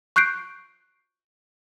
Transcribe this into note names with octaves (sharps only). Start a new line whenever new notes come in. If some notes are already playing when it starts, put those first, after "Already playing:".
C#6 F#6 G6 C7 D7